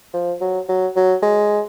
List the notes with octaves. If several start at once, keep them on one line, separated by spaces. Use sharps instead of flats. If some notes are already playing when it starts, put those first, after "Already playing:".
F3
F#3
F#3
F#3
G#3